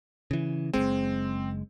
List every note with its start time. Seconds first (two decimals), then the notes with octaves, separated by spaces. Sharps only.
0.31 C#3 E3
0.74 F#1 D#2 G#3 C4